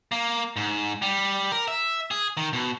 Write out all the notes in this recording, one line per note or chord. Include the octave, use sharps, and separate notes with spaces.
A#3
G#2
G3
A#4
E5
G#4
D#3
B2